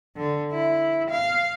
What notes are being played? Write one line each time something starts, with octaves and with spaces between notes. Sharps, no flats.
D3
E4
F5